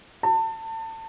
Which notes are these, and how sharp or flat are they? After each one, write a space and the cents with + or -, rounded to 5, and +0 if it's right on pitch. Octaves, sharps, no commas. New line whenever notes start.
A5 +30